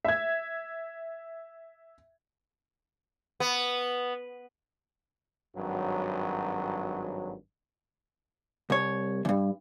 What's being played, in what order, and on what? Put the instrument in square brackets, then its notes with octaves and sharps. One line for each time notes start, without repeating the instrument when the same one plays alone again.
[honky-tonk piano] E5 G#6
[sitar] B3
[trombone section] G#1 G2 F#3
[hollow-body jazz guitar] C2 C#5
E2 G2